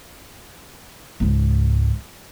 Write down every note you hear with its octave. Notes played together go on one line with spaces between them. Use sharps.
C#2 G#2